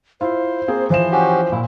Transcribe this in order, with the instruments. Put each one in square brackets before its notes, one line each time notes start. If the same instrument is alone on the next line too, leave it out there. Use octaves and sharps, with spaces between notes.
[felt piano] E4 F4 [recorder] C5
[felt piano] A#3 C4 G#4
[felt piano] E3 F3 E7 [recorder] C5
[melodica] C#4 F#4 G4
[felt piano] A#2 [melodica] E4